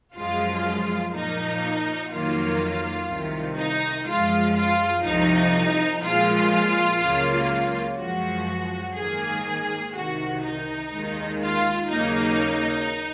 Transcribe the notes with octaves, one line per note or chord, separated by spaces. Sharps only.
F#2 F3 G#3 F4
A#2 F3 A#3 D#4
F2 D#3 F#3 A#3 F4
C2 C3 D#3
D#4
F#2 F3 G#3 F4
F4
C2 C3 F3 D#4
A#2 F3 G#3 F4
C#2 C#3 F#3 A#3
F#2 F3 G#3 F#4
G#2 D#3 A#3 G#4
C2 C3 D#3 F#4
D#4
D#2 D#3 G#3
F4
D#2 C#3 F#3 A#3 D#4